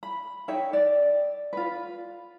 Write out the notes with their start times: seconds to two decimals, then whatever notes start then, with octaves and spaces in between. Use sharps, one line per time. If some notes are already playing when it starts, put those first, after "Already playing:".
0.03 B5
0.48 D#4 C#5 E5 G5
0.73 D5
1.53 F4 B4